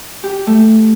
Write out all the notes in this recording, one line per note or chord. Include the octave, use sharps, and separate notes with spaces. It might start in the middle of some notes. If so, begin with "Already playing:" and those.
G4
A3